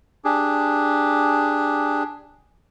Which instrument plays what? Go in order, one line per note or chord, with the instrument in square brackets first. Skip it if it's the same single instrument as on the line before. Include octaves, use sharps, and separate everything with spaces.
[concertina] D4 G4 G#4